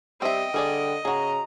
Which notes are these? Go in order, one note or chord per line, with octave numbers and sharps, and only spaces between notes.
G3 C4 D#5 E5 G5
D3 G3 G#4 D5
C#3 F#4 G#4 A#5